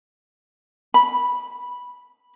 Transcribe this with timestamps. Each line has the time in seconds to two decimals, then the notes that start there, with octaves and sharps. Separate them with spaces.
0.94 B5